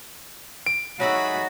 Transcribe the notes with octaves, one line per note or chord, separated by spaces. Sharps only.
D7
F#3 D#4 F#4 G#4 A4 E5 B5